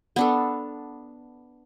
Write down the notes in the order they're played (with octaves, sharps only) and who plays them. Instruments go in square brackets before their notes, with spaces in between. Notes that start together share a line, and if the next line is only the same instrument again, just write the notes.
[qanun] B3 D4 A4